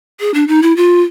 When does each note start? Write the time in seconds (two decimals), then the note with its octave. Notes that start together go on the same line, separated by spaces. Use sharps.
0.20 G#4
0.34 D4
0.48 D#4
0.62 E4
0.77 F4